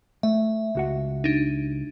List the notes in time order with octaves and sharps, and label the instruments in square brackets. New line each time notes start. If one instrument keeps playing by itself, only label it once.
[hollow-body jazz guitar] A3 [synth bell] E5
[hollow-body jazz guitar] C#2 F#4 F#5
[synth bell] D4 D#4